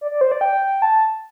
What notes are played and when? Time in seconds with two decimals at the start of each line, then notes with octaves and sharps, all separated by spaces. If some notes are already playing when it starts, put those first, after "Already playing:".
0.01 D5
0.11 D5
0.21 C5
0.32 D5
0.41 G5
0.82 A5